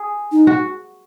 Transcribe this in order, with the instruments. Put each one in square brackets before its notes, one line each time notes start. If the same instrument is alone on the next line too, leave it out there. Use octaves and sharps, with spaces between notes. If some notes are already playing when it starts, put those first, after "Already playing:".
Already playing: [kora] G#4
[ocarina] D#4
[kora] F#4